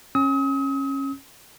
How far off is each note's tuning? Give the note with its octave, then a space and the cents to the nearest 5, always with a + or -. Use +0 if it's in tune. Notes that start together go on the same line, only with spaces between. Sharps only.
C#4 -20 D#6 +40